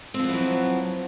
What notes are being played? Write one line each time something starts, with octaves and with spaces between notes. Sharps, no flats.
F3 F#3 B3 C4 E4